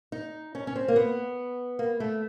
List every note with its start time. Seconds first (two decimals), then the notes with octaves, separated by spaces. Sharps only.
0.12 D#4
0.55 C#4
0.67 C#4
0.76 C4
0.88 A#3
0.96 B3
1.79 A#3
2.00 A3